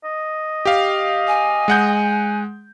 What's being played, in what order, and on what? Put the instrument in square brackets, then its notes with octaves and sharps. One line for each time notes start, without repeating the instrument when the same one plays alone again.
[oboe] D#5
[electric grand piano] G4 F5
[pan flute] G#5
[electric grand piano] G#3 F#5 G6